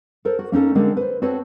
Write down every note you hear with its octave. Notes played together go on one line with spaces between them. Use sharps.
A4 A#4 C5
F#4
A#3 C#4 D#4 A4
D3 G#3 A#3 C4
B4 C5
C4 F#4 A4 B4 C#5